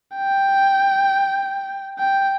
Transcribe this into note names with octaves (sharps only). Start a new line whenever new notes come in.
G5
G5